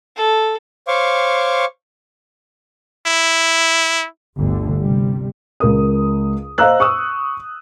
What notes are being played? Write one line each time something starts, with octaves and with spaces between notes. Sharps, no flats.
A4
C5 C#5 F5 C#6 D6
E4
G1 D2 D3
C3 G3
C#2 A#4 D#6
C5 D#5 F5 A#5 E6 F#6
C#6 D#6 E6